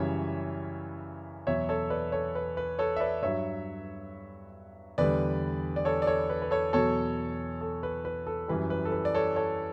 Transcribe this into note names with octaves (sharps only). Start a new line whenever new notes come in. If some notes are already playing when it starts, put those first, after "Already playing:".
Already playing: F#2 C#3 E3 G3 C#5 E5
E2 B2 F#3 C#5 E5
A4 C#5
B4 D5
A4 C#5
B4
B4
A4 C#5
E5
B4 D5
G2 F#3 C#5 E5
E2 D3 G3 B4 D5
D5
A4 C#5
D5
A4 C#5
B4
B4
A4 C#5
E2 B2 F#3 A4 C#5
A4
B4
B4
A4
F#2 E3 G3 B4
B4
A4
B4
D5
A4 C#5
A4 C#5